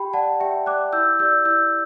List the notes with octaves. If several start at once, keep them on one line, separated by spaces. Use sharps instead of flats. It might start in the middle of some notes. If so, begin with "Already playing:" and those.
Already playing: G4 G5 B5
D5 F#5 A5
G4 E5 G5
D5 D6 F#6
E4 E6 G6
G4 D5 E6 G6
E4 E6 G6